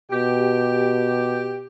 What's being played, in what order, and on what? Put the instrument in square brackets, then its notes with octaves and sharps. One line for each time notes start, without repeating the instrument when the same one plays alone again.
[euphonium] B2 [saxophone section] G4